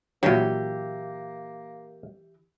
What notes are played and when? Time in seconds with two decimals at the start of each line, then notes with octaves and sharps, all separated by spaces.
0.23 A#2 E3 F#3 A#3 G4